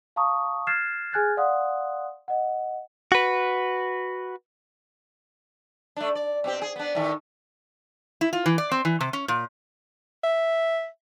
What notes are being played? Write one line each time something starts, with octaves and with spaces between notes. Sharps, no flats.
F5 A5 A#5 C#6 D#6
F6 F#6 G#6 A6 C7 E7
G#4 G#5 F6 F#6 G#6 A6
D5 F5 F#5 C6 D#6 F#6
D#5 F#5
F#4 B4
A3 D4
D5
B2 C4 G4
G#4
B3 D4
A2 D#3
E4
F4
E3
D5
C4
E3
C3
C#4
A#2
E5